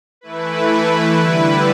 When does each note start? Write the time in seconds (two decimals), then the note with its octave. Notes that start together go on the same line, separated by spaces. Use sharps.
0.21 E3 A3 E4 B4
1.18 D3 G3 E4 B4